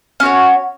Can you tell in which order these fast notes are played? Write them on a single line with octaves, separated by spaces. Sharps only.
C#4 F#4 C#5